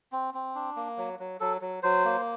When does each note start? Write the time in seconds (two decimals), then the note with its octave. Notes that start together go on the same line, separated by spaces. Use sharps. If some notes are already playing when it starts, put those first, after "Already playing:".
0.12 C4
0.34 C4
0.55 D4
0.76 A#3
0.97 F#3
1.19 F#3
1.40 F#3 A4
1.61 F#3
1.83 F#3 C5
2.05 A#3